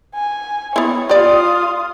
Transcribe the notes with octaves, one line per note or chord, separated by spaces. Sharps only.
G#5
B3 E4 C#5
F4 G4 D5 D#6